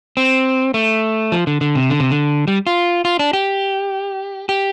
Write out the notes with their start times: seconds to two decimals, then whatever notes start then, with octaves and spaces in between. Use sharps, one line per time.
0.17 C4
0.74 A3
1.32 F3
1.47 D3
1.61 D3
1.75 C3
1.90 D3
2.00 C3
2.11 D3
2.48 G3
2.67 F4
3.05 F4
3.19 D4
3.33 G4
4.49 G4